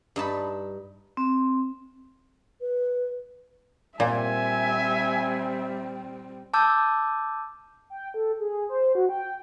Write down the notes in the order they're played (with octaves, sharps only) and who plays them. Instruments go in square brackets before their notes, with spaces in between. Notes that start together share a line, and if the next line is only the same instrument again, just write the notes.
[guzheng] G2 D#4 A5 B5
[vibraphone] C4
[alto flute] B4
[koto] A#2 [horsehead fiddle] G3 C4 [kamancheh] E5 [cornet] G#5
[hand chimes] A5 D6 E6 G6
[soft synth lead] G5
A4
G#4
C5
F#4
G5